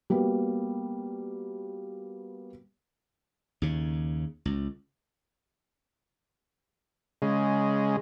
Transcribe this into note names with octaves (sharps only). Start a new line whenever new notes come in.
G3 A#3 B3 F#4
D#2 C#3
C#2
C#3 G#3